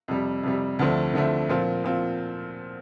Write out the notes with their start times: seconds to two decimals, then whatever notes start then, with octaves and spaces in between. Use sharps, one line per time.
0.08 F2 C3 G3
0.43 F2 C3 G3
0.79 D2 D3 F3 A3 C4
1.14 D2 D3 F3 A3 C4
1.49 A#2 F3 C4 F4
1.84 A#2 F3 C4 F4